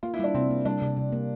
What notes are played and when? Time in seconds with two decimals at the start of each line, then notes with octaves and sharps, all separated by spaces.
0.03 A#3 F4
0.14 E4
0.19 G3 D4
0.34 C3 C4
0.50 A#3
0.65 G3 D4
0.82 C3
0.97 C3
1.12 A#3